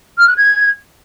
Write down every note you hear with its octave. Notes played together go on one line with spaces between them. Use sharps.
F6
F#6
G#6